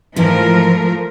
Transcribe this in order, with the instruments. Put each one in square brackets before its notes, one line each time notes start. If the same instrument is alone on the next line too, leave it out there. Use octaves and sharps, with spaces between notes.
[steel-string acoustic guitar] G#2 E3 [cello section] F3 A3 A#4